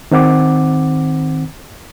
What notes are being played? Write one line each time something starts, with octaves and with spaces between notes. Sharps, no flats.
D#3 C4 F#5 D6